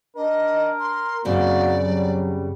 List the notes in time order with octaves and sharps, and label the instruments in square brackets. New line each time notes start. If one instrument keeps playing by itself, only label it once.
[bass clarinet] D4 [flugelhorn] A#4 [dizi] D#5
[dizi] C6
[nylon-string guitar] F#2 C#3 C4 [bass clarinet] A#3 [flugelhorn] F#4 [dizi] D5
[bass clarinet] F#3 [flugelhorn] G3